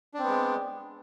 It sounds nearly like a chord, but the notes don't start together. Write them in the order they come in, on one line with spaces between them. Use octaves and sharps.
D4 C4 B3 G#3